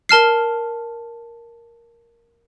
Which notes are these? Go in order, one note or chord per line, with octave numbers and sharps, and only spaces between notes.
A#4 A5 F6 C7